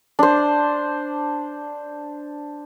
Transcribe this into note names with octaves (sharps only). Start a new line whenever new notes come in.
D4 C5